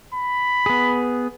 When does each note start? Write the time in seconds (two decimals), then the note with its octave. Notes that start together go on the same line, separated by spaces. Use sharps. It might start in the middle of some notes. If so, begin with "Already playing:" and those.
0.14 B5
0.66 B3 G#4